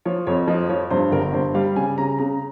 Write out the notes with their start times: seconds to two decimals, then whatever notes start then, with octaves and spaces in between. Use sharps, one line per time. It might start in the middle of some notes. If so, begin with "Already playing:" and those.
0.05 F3 C#5
0.27 F2 C#5
0.47 F3 D#5
0.69 F3 C#5
0.90 G2 C5
1.12 G1 A#4
1.34 G2 C5
1.54 G3 F5
1.76 C#3 G#5
1.98 C#3 A#5
2.19 C#3 A#5